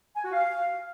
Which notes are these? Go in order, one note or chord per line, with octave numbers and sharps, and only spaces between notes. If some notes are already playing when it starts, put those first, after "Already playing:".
G#5
F#4
F5